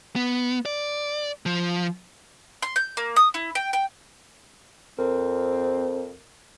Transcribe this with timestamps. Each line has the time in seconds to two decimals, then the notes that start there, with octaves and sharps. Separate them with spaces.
0.16 B3
0.66 D5
1.46 F3
2.62 C6
2.76 G6
2.97 A#3
3.16 D#6
3.34 E4
3.55 G5
3.73 G5
4.99 F2 C4 A#4